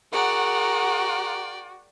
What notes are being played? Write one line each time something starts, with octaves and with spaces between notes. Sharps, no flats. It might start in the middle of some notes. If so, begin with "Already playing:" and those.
F#4 G#4 A#4 D5 F#5 G5 A#5